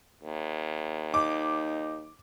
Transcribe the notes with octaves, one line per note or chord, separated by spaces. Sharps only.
D#2
D#4 D6